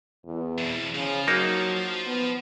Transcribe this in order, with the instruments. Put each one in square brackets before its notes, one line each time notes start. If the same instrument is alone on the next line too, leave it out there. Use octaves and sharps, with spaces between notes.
[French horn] E2
[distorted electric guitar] F2 B2
[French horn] C#3 [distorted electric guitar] F3
[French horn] F#3 [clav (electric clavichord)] A#3 D#4 A#4
[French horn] B3